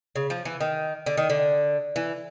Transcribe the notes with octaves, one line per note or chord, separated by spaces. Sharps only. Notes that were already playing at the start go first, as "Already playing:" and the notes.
C#3
F3
E3
D#3
D3
D#3
D3
E3